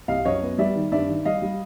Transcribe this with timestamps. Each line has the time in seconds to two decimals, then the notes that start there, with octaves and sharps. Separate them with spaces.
0.08 C2 D#5 F5
0.25 F#2 C#5 D#5
0.42 B3
0.58 G3 D5 E5
0.75 D#3
0.92 G2 D5 E5
1.09 D#3
1.25 G3 D#5 F5
1.42 G3